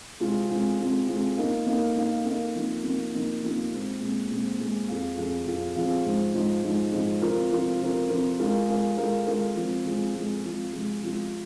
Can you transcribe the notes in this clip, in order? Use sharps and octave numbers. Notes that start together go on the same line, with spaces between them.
C3 G#3 C4 F4
C3 G#3 C4 F4
C3 G#3 C4 F4
C3 G#3 C4 F4
A#3 D#4 A#4 F5
A#3 D#4 A#4 F5
A#3 D#4 A#4 F5
A#3 D#4 A#4 F5
C3 F3 A#3 D#4
C3 F3 A#3 D#4
C3 F3 A#3 D#4
C3 F3 A#3 D#4
A#2 G#3 C4
A#2 G#3 C4
A#2 G#3 C4
A#2 G#3 C4
F2 F3 C4 G#4 F5
F2 F3 C4 G#4 F5
F2 F3 C4 G#4 F5
F2 F3 C4 G#4 F5
G#2 F3 G#3 D#4 C5
G#2 F3 G#3 D#4 C5
G#2 F3 G#3 D#4 C5
G#2 F3 G#3 D#4 C5
C3 F3 C4 F4 A#4
C3 F3 C4 F4 A#4
C3 F3 C4 F4 A#4
C3 F3 C4 F4 A#4
G#3 F4 A#4 F5
G#3 F4 A#4 F5
G#3 F4 A#4 F5
G#3 F4 A#4 F5
F3 G#3 C4
F3 G#3 C4
F3 G#3 C4
F3 G#3 C4
C3 F3 G#3 F4
C3 F3 G#3 F4